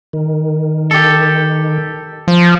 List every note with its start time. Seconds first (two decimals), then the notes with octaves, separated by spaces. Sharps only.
0.13 D#3
0.91 G4 A4
2.28 F3